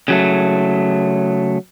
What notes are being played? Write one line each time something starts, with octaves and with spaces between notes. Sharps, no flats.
C#3 F#3 A3